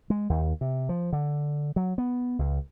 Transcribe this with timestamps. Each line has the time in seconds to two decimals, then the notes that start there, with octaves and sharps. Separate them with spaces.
0.10 G#3
0.30 D#2
0.61 C3
0.89 F3
1.13 D3
1.76 F#3
1.98 B3
2.39 C#2